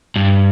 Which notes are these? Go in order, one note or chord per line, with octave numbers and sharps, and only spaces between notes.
G2